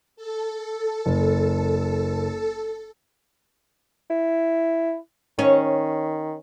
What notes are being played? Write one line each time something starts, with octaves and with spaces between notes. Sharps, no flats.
A4
F#1
E4
D#3 C#4